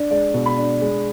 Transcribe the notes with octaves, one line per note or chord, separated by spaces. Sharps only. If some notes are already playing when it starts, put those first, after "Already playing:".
Already playing: D4
G#3 D5
B2
B5
D4
G#3